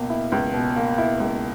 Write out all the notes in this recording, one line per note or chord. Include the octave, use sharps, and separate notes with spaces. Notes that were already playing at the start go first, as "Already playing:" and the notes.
Already playing: C#2 B2 A#3
E4
C#2
B2
A#3
E4
C#2